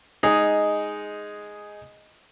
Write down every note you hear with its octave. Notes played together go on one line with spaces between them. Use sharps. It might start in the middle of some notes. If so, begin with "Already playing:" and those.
G#3 D#4 G#4